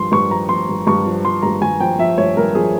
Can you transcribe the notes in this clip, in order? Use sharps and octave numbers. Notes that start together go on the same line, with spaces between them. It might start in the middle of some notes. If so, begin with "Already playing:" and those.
Already playing: G2 F3 C6
G2 C#6
F3 A#5
F3 C6
G2
G2 C#6
F3
F3 C6
G2 A#5
G2 G#5
F3 G5
F3 E5
G2 C#5
G2 A#4
F3 G#4